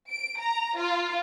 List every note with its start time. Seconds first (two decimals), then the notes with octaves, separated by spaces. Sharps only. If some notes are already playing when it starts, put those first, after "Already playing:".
0.10 D7
0.40 A#5
0.78 F4